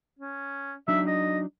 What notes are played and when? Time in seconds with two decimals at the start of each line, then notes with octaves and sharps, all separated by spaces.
0.19 C#4
0.88 F#3 D4 D#4 E5
1.07 D#5